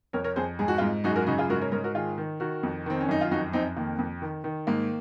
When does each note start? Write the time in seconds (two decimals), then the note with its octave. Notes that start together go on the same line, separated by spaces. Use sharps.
0.13 F2 A#4 C#5
0.24 A#4 C#5
0.36 F2 G#4 C5
0.59 G#2 G#4
0.68 F#4
0.78 F4 G#4
0.82 G#2
1.04 F#2 D#4 F#4
1.10 G#4
1.16 F#4 A#4
1.26 C#3 D#4 F#4
1.38 F4 G#4
1.49 G#2 F#4 A#4
1.61 A#4 C#5
1.72 G#2 A#4 C#5
1.84 F#4 A#4
1.94 D#3 F4 G#4
2.18 D#3
2.40 D#3 F#4 A#4
2.63 F2
2.86 D#3 C4
3.01 C#4
3.08 F#2 D#4
3.21 F4
3.31 F2 D#4 F#4
3.53 F2 C4 D#4
3.77 D#3 A#3
3.99 F2
4.22 D#3
4.44 D#3
4.67 G#2 A#3